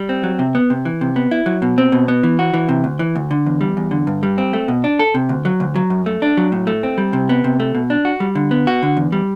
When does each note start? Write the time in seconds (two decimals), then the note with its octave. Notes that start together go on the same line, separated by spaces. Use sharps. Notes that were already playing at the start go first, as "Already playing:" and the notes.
Already playing: G3
0.09 C4
0.23 F#3
0.39 C3
0.55 B3
0.70 C3
0.85 E3
1.01 C3
1.16 B3
1.31 E4
1.46 F#3
1.62 B2
1.78 C4
1.92 B2
2.08 B3
2.23 E3
2.39 F#4
2.54 E3
2.69 C3
2.84 D2
2.99 E3
3.15 D2
3.31 D3
3.46 E2
3.61 G3
3.77 E2
3.91 D3
4.07 G2
4.23 G3
4.38 C4
4.53 A3
4.68 B2
4.84 D4
4.99 A4
5.14 C3
5.29 D2
5.45 F#3
5.60 D2
5.76 F#3
5.90 F#2
6.06 A3
6.22 D4
6.37 F#3
6.52 A2
6.67 A3
6.83 C4
6.98 G3
7.13 C3
7.29 B3
7.44 C3
7.60 A3
7.75 B2
7.90 D4
8.05 F#4
8.20 G3
8.35 D3
8.51 B3
8.67 F#4
8.83 D3
8.97 E2
9.12 G3